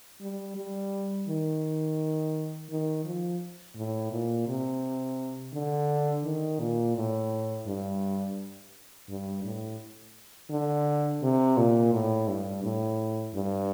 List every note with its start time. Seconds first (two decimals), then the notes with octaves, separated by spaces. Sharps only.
0.21 G3
0.57 G3
1.28 D#3
2.70 D#3
3.05 F3
3.76 A2
4.12 A#2
4.48 C3
5.54 D3
6.25 D#3
6.60 A#2
6.96 A2
7.67 G2
9.09 G2
9.44 A2
10.50 D3
11.23 C3
11.57 A#2
11.93 A2
12.28 G2
12.64 A2
13.34 G2